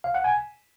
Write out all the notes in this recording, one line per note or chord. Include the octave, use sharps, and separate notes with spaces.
F5
F#5
G#5